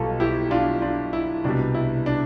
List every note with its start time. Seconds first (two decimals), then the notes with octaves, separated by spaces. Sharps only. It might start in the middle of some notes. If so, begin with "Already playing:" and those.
Already playing: B1 B2 G3 F4 A4
0.20 E4 G4
0.51 D4 F4
0.82 D4 F4
1.13 E4
1.44 C2 B2 G3 D4
1.74 E4
2.06 D4